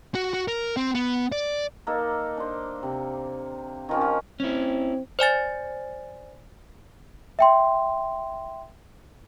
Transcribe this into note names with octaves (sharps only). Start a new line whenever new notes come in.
F#4
F#4
A#4
C4
B3
D5
A#3 D#4 A4
D4 C5
C3
D#3 F3 C#4
F3
C4 C#4 E4
C5 D5 G#5 A6
E5 G5 C6